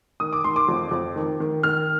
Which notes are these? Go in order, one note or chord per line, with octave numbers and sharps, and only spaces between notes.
D#3 D#6
D6
D#3 C6
D6
F2
F2
D#3
D#3
D#3 F6